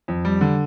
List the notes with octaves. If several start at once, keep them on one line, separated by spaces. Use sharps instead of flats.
F2
G3
D3